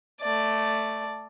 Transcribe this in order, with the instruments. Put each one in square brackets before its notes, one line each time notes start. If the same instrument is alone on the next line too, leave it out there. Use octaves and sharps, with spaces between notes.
[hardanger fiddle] A3 D5